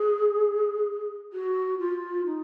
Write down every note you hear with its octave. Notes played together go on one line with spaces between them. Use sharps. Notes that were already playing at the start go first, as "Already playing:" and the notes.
Already playing: G#4
F#4
F4
D#4